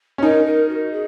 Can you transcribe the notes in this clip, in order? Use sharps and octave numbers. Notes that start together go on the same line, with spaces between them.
C#4
D#4 A#4
A#4
F#4
G#4